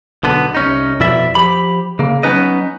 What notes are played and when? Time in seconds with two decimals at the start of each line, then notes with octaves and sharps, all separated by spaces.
0.23 B1 D3 B3
0.55 C2 C#4 D#4
1.00 F2 B2 E4 D5 E5
1.35 F3 G4 B5
1.99 C#3 A#3
2.23 F#3 B3 C#4 D#4 B4 D#5